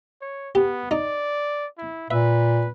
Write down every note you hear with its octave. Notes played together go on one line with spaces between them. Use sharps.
C#5
B3 G4
D#4 D5
E4
A#2 B4 E5